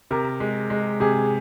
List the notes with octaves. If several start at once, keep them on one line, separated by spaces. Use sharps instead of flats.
C3 A#4
G#3
G#3
C3 G#4